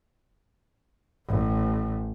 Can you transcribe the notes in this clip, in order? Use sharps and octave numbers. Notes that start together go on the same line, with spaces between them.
A1